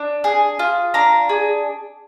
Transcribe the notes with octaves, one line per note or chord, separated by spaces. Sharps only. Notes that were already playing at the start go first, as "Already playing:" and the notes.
Already playing: D4
G#4
F4
D4 A#5
G#4